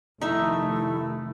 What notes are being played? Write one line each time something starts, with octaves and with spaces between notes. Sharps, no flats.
F1 D#3 A3 D#4 E4 E5